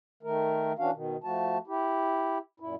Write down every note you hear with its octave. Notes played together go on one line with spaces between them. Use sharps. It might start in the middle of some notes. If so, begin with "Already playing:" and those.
D#3 A3 A#4
E3 C#4 D4 F#4 F5
B2 D#3
F3 A3 F#4 A5
E4 G4
F#2 A#2 E4